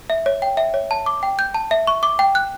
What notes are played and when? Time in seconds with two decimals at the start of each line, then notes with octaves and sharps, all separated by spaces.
0.10 E5
0.26 C#5
0.42 G5
0.57 E5
0.74 C#5
0.91 A5
1.06 D6
1.23 G5
1.39 G6
1.54 A5
1.71 E5
1.87 C#6
2.03 D6
2.19 G5
2.35 F#6